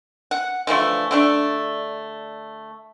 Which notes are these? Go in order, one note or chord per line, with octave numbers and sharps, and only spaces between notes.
F#5
D3 E3 F3 A3
D3 A3 D4